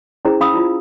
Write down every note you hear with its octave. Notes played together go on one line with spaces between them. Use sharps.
C#4 E4 G#4 C5 A#5
C#4 F5 B5 D#6 E6
E4 F4